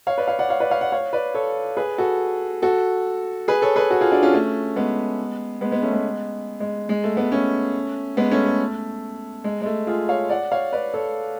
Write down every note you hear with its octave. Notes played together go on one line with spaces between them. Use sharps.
C#5 F5
B4 D5
C#5 F5
D5 F#5
C#5 F5
B4 D5
C#5 F5
D5 F#5
C#5 F5
B4 D5
A4 C#5
G#4 B4
F#4 A4
F#4 A4
G#4 B4
A4 C#5
G#4 B4
F#4 A4
F4 G#4
D4 F#4
C#4 F4
A3 C#4
G#3 B3
G#3 B3
G#3 B3
A3 C#4
G#3 B3
G#3
G#3
A3
G#3 B3
A3 C#4
G#3 B3
A3 C#4
A3
G#3
G#3
A3
F4 G#4
C#5 F5
D5 F#5
C#5 F5
B4 D5
A4 C#5